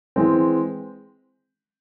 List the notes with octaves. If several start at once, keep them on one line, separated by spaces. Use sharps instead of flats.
E3 G#3 C4